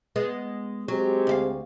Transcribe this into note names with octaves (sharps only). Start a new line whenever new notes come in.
G#3 B3
F#3 G#3 C4 G4
D2 E4 F5